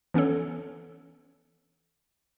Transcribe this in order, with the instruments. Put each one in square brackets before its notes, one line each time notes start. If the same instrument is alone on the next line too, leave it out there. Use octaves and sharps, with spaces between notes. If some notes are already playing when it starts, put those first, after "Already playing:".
[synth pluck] E3 B3 C#4 D4 A4 C#5